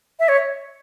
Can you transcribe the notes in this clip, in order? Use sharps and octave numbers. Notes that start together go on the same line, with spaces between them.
E5
C#5